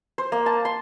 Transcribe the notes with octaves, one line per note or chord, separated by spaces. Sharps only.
C5
A#3
A5
C6